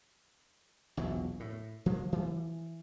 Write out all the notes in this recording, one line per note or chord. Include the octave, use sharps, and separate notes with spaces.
A#1 E2 B2 F#3
A2
F3 F#3 A#3
E3